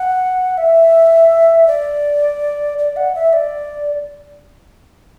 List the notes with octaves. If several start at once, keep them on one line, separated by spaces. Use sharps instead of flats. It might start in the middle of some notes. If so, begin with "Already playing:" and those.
Already playing: F#5
E5
D5
D5
F#5
E5
D5